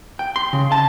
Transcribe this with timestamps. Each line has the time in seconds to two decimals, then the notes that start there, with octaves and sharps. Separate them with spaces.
0.19 G5
0.36 C6
0.53 C#3
0.72 A5